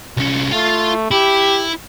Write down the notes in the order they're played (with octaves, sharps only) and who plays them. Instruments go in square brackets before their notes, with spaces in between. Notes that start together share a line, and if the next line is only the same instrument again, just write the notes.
[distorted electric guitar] C2 C#4
[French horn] A3 [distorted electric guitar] F4 F5
[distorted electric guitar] E4 [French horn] G4